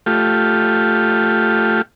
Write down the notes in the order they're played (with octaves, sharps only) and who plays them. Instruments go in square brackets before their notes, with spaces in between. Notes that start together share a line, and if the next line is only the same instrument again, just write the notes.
[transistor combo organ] A3 F4 G4